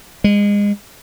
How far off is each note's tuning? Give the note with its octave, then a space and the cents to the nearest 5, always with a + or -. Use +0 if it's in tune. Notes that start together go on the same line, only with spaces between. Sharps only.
G#3 -25